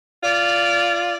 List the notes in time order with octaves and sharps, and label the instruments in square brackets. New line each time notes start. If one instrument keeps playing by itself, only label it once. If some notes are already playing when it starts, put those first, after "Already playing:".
[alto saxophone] F4 [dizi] D5